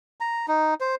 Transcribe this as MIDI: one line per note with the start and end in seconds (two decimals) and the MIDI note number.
0.20 0.46 82
0.48 0.74 63
0.81 0.95 72